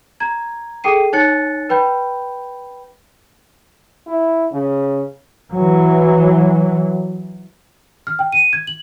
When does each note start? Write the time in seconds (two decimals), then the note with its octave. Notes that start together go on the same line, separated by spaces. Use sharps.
0.20 A#5 G#6
0.84 G#4 A4 G5 C7 D#7
1.13 D#4 C#5 G#5 F#6 A6 C#7
1.69 B4 G5 B5 G6
4.07 E4
4.52 C#3
5.53 E3 F#3
8.07 F6
8.19 G5
8.32 D#7
8.53 G#6
8.67 F#7